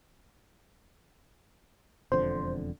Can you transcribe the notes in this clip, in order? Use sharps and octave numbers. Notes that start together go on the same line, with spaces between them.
E1 F2 D3 C5